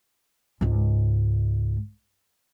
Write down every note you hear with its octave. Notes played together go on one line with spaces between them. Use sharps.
C#2 G#2